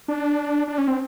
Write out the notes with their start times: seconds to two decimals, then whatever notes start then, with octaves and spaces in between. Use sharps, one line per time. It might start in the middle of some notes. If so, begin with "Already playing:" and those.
0.08 D4
0.68 D4
0.78 C#4
0.88 C4